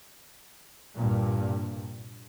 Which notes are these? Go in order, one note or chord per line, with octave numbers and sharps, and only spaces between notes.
C2 G2 A#2